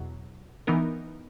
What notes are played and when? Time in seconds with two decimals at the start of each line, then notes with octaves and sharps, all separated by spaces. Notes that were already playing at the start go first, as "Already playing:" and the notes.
Already playing: E2 B2 F#3
0.67 E3 B3 D#4 A#4